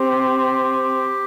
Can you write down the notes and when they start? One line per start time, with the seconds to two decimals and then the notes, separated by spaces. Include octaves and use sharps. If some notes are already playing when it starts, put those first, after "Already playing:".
Already playing: C4 G4